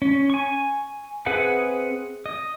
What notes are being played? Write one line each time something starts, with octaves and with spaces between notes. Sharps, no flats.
C#4
G#5 C#6
C4 G#4 B4 E5 F#5
D#5